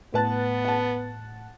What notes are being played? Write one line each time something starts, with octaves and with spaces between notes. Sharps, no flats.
A2 B3 B4 A5 F#6 A6
F#5 A5